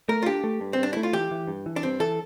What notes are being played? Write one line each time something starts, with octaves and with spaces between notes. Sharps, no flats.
A3 A#4
F4
D4 G4
A3
G2
C4
G2 D4
A3 E4
F4
E3 G4
E3
G2
E3
D4
G2 C4
E3 A4